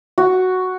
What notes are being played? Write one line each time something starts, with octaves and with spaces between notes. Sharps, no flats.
F#4